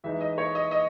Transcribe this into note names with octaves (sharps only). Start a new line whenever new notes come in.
E3 G#3 D#4 E5
D#5
C#5
D#5
D#5